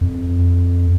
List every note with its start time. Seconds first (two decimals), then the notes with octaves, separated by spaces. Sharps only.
0.01 F2